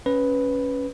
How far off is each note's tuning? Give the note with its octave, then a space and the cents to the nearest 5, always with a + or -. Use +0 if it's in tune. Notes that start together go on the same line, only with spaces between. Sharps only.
C#4 +0 B4 +0